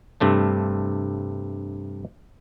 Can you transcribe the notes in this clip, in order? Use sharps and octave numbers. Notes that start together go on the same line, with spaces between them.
G2 C3 A3 D4